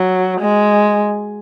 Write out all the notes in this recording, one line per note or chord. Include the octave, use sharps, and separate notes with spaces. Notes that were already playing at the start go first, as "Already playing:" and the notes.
Already playing: F#3
G#3